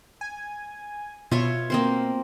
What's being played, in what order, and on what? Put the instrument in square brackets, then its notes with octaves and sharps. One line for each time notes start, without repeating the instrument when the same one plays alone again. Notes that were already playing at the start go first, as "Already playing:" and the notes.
[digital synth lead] G#5
[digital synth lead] B2 [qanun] F4 C#5 E5
[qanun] A#3 C4 C5